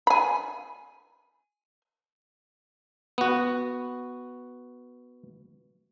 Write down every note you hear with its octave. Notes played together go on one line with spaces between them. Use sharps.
G#5 B5
B3 F#4